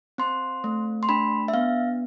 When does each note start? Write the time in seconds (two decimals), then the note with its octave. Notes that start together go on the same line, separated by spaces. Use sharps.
0.18 C4 C6
0.64 A3
1.03 C6
1.09 D4 B5
1.48 E5
1.54 B3 F5